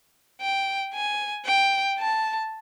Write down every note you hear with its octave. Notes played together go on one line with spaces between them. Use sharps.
G5
G#5
G5
A5